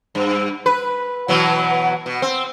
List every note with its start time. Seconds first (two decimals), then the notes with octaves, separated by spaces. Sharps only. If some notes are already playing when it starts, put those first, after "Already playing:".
0.15 G2
0.66 B4
1.28 B2 E3 F#3
2.06 B2
2.22 C4